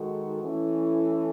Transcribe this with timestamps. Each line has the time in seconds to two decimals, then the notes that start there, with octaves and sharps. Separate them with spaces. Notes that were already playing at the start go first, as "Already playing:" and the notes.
Already playing: D#3 G#3 D#4 F#4 A4
0.43 E3 A3 C#4 E4 A4